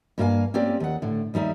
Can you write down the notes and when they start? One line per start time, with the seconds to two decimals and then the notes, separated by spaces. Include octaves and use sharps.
0.18 G2 A#3 F4 A4 F5 G#5
0.54 A#3 C4 C#4 G4 D5
0.80 D#2 F#5
1.02 A2 D3
1.34 D#2 G3 D#4 E5